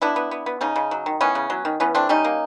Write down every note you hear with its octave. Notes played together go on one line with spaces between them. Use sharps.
B3 D4 E4
B3
B3
B3
C#3 C#4 D#4
C#3
F#3
D#3
E3 B3 C#4
C#3
F#3
D#3
E3 B3 C#4
A3 C4 D4
G3 C#4 D#4
A#3